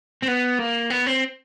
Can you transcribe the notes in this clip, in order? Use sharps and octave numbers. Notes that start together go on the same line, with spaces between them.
C4
B3
A#3
B3
C4